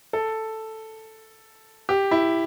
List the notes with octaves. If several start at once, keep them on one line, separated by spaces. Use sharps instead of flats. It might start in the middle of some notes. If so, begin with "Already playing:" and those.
A4
G4
E4